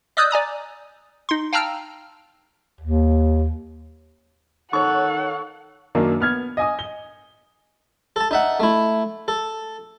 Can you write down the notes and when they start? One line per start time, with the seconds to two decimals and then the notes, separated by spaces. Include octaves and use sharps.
0.17 D5 D#5 D#6 E6 F#6 G6
0.31 D5 G#5 A#5 D#6
1.29 D#4 C6
1.53 F5 G5 A5 A#5 E6 F6
2.81 D#2
4.73 D#3 A4 C#5 F#5 C#6
5.95 F#2 D#3 A#3 D4
6.20 B3 F6 G#6
6.57 D#5 G#5 D#6
6.79 G7
8.16 A4 A5
8.31 D#4 E5 F#5
8.60 A3 E4
9.28 A4